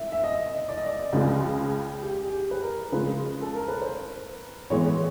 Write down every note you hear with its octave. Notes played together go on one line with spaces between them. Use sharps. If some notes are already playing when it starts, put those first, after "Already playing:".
Already playing: E5
E5
D#5
D5
D#5
D5
C#2 C#3 F3 G#3 G#4
G4
G#4
G4
B4
A#4
C#3 F3 G#3 B4
A4
A#4
B4
C5
A2 E3 G#3 B3 C#5